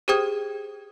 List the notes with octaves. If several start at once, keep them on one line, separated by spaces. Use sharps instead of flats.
G4 G#4 C5 G5 D#6 G#6